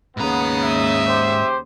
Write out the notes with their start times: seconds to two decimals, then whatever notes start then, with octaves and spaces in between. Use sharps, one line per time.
0.17 D#2 G#2 C#3 B3 A#5 D#6
0.62 E5
1.07 G4 C5